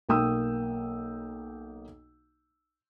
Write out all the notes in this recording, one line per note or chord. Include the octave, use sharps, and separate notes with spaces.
B1 A#3 G5 D#6 E6